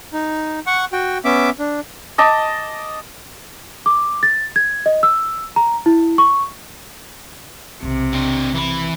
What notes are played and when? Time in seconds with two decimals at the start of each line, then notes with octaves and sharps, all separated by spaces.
0.13 D#4
0.67 F#5 C#6
0.93 F#4 G5
1.25 B3 C#4 E5 D6
1.59 D4
2.18 D#5 A5 D6
3.86 D6
4.23 A6
4.56 G#6
4.86 D#5
5.03 E6
5.56 A#5
5.86 E4
6.18 C#6
7.83 B1 C3 D#3
8.13 C4 D4
8.54 E3 B5